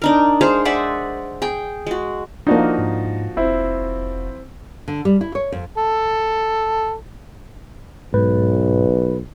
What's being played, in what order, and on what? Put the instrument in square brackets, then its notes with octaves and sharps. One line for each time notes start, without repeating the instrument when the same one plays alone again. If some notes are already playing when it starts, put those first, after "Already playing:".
[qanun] D4 D#4 A#4
G#3 G#4 C5 F5
D5 E5 F#5 G#5
G#4 G5
G#3 F#4
[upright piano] F3 F#4 [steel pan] A#3 D4 [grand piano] D#4
[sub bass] G#2
[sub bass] F1 [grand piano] C4 E4
[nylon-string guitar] D3
G3
E4
C#5
F2
[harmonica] A4
[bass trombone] B1 [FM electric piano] G#2 [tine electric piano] B4